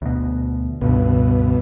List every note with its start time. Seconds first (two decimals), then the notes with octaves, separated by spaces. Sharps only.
0.02 D2 B2
0.81 C#2 G2 B2 D3